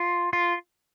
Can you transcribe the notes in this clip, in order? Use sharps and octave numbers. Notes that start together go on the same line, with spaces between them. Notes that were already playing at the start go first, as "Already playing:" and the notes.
Already playing: F4
F4